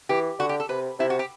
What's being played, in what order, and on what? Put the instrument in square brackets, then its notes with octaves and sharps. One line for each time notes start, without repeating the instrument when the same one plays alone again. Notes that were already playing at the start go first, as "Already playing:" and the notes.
[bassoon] E3 [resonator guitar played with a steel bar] G4
[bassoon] D3 [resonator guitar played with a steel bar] F#4
[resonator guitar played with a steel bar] G4
A4
[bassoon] C3 [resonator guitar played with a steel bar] B4
[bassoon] C3 [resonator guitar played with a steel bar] E4
[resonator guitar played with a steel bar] F#4
G4